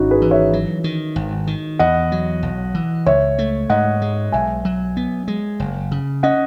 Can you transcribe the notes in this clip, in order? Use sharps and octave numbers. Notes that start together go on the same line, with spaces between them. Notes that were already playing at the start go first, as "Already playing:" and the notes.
Already playing: G#1 C#4 D#4 E4 F#4
G#4 B4
E3
C#5 E5
F#3
D#3
G#1
D#3
E2 D#5 F#5
F#3
B1
E3
C#2 C#5 E5
A3
G#2 D#5 F#5
G#3
B1 E5 G#5
F#3
B3
G#3
F#1
C#3
C#4 D#5 F#5